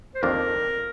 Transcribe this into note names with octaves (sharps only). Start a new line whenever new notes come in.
C5
F2 D#3 A#3 D4 A#4